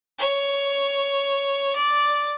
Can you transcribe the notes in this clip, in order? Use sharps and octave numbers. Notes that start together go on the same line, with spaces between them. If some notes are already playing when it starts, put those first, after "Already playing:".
C#5
D5